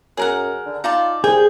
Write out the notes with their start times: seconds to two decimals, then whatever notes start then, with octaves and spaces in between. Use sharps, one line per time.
0.17 F#2 G#4 A#4 F#5
0.66 D3
0.84 D#4 F4 D5 A5
1.24 C2 G#4 G5